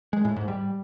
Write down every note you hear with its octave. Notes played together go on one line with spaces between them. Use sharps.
G#3
A2
G#2
G3